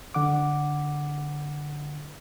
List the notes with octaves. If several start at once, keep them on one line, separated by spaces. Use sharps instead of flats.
D3 F#5 D6